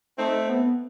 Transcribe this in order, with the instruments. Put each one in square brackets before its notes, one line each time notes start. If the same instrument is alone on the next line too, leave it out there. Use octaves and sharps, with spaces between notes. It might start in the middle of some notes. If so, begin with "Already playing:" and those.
[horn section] A3 C4 [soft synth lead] D#4
[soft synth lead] B3